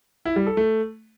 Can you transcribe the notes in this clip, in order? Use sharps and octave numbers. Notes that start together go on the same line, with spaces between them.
E4
G3
A4
A3